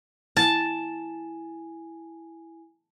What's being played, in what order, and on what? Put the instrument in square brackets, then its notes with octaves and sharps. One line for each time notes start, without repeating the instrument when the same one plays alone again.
[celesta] E4 G#5 [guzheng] A5